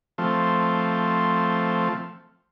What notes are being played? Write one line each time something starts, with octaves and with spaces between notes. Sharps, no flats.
F3 A3 C4